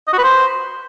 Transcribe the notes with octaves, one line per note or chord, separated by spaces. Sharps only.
D#5
F#4
B4
C5